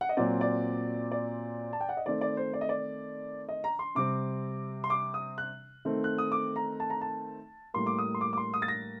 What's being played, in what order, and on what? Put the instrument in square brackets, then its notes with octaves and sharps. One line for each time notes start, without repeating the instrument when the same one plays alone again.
[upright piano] F#5
D#5
A#2 F#3 C4 D5
D5
D5
A5
G5
F#5
D#5
D#3 A3 C4 D5
D5
C5
D5
D#5
D5
D#5
A#5
C6
C3 G3 C4 D6
C6
D6
D#6
F#6
D#3 A3 C4
F#6
D#6
D6
A#5
A5
A#5
A5
A2 G3 A#3 C6
D6
D#6
C6
D6
D6
C6
D#6
A6
A#6